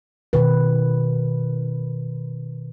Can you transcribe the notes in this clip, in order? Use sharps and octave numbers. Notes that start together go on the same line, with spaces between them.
B2 D#3 B4